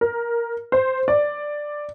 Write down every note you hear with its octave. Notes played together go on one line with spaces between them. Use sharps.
A#4
C5
D5